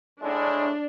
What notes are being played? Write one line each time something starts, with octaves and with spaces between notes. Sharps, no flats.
A2 G#3 D4